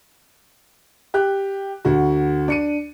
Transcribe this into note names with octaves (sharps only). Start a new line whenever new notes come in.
G4 F#6
D2 F#4
D4 C#7 D#7